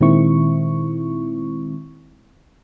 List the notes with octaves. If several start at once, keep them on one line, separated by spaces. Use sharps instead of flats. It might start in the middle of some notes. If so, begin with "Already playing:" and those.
A#2 D#3 G#3 C4 E4 C#6